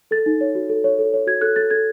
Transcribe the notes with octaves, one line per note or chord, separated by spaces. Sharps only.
A4 A6
D#4
C#5
F#4
A4
C#5
A4
C#5
F#4 G#6
A4 F#6
A4 A6
A4 G#6